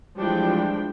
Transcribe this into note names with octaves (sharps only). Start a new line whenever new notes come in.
E3 F3 G3 G#3 D4 G5